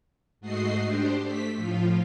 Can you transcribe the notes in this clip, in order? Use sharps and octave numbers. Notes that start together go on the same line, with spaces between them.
G#2 A3 F#4 D#5 C7
D4 G4 C5
A3 B6
A2 F3 F4